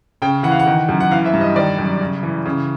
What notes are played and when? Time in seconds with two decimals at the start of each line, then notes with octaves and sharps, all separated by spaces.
0.22 C#3 G5
0.43 E3 F#5
0.51 F5
0.59 F#5
0.66 D#3
0.89 F#2
1.00 F#5
1.11 E3 F5
1.26 E5
1.34 G2
1.41 D#5
1.56 D#3 D5
1.78 F#2
2.00 C#3
2.23 E3
2.45 C#3